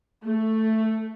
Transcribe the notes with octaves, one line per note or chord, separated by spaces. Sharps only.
A3